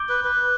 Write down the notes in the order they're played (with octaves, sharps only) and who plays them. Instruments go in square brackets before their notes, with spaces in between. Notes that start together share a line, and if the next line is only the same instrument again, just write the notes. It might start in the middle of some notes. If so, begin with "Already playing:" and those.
Already playing: [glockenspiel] D6 G6 D7 G7
[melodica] B4
B4